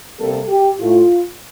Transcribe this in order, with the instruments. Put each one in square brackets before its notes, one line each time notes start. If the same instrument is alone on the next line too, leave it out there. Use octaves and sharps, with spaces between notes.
[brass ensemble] C3 G3 A#3 A4
G4
A2 A3 F4